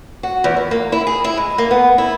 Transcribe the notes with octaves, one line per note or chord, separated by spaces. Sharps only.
F#4
E2
D#3
A#3
E4
G#4
E4
G#3
A#3
B3
E4